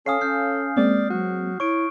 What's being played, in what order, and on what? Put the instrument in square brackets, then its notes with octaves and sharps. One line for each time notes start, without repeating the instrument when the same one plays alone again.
[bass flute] C#4 [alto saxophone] A4 [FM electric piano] C#5 F5 G#5 [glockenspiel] D#6 F6 C7
[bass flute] C#4 [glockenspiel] F6 G6 C7
[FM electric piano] G#3 A#3 C4 [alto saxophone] D5
[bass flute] F#3 [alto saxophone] F#4
[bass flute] E4 [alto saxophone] C#5 [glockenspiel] C#6 D7